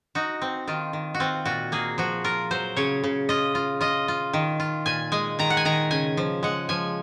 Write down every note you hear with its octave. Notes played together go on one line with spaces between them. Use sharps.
D#4 F#4
C4
D#3 F4
D#3
F#4
C4 F4
A#2 F#4
A#3 G#4
F3 F#4
F4 A#4
F#3 C5
C#3 C#5
C#3
F4 D#5
F4
F4 D#5
F4
D#3
F4
A#2 G#5
G#3 G#5
D#3 A#5
F#5
G#5
D#3 A#5
C#3 G#5
F3
G#3 F#5
F3 G#5